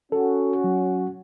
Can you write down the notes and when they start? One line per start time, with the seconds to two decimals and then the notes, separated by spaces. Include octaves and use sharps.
0.12 C#4 F#4 A4
0.64 F#3